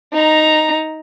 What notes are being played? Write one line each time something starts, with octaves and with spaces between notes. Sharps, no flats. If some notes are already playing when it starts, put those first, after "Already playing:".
D#4 A#5